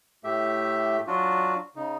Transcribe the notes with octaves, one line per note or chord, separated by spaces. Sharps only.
A2 A3 G4 E5
F#3 D4 F4 F#4
C#3 D#4